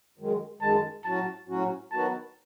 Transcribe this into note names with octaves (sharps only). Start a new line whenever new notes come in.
F#2 D#3 G#3
F#2 D#3 G#3 A5
A2 F#3 C#4 F#4 A5
A2 F#3 C#4 F#4
D#3 F#3 B3 F#4 A5